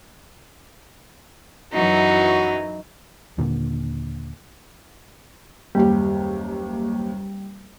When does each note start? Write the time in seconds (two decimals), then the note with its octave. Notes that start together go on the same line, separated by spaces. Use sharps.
1.73 F#2 E3 F#3 D#4 F#4
3.38 D#2 A#2 D3 A#3
5.75 F#1 D#2 G3 G4